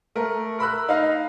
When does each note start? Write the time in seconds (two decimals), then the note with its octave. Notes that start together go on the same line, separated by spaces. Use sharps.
0.15 A3 A#4
0.59 A#4 B5 E6 F#6
0.89 D#4 F5